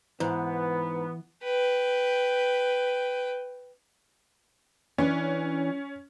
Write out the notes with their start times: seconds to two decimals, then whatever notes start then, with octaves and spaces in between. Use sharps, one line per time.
0.20 G#2 E3 B3
1.43 B4 G5
4.98 E3 C#4 D4